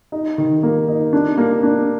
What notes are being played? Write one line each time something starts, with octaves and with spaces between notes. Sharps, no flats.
D#4
D#3
A#3
D#4
D4
A#3
D4